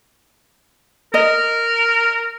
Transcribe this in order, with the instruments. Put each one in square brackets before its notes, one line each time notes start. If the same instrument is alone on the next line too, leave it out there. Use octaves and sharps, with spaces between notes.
[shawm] A#4 [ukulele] D#5